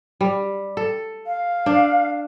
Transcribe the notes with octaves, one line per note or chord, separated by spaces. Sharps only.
G3
A4
F5
D4